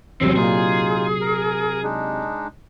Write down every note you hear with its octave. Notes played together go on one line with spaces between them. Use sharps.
E2 C3 F#3 C4 C#4
A#2 D#4 F4 G#4
A#4
G#3 D4 D#4